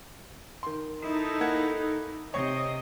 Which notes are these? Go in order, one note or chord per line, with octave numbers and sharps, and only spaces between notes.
D#3 C6
D#4 E4 A4
A#3 F#5 G#6
C3 C#5 D#5